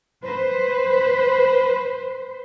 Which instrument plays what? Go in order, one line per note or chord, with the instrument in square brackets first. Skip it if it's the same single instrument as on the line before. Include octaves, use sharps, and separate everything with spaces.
[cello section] B4 C5